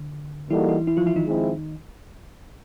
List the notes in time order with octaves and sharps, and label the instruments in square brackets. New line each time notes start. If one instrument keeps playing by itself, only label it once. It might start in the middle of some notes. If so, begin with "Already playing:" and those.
Already playing: [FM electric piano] D3
[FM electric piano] E3 E4 [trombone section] G3 A#3 D#4 F#4 A4
[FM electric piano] E3 E4
E3 E4
F3 F4
E3 E4
D#3 D#4
[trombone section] F3 G#3 C4 E4